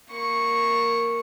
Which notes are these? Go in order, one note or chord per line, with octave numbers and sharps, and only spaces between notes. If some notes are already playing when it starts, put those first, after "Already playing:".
A#3 C#6